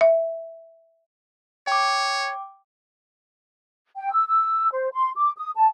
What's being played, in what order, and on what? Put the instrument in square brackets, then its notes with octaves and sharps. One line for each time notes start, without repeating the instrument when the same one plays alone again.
[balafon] E5
[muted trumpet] C#5 [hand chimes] G5 D6
[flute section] G5
E6
E6
C5
C6
D6
D#6
A5